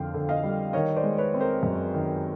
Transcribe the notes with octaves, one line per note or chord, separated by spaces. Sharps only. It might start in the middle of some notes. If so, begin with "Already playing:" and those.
Already playing: F2 D3 F5 G5
D3
D#5 F5
G3
D#3 C#5 D#5
C5 D5
G#3
B4 C#5
C4
A#4 C5
F#2
D#3